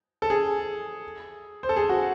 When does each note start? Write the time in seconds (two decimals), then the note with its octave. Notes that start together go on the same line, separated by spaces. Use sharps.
0.22 A4
0.30 G#4
1.63 C5
1.69 A4
1.76 G#4
1.89 F#4